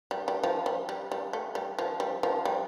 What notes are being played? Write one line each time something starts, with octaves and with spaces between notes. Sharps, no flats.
G3
G3
F3
G3
G3
G3
A3
G3
F3
G3
F3
G3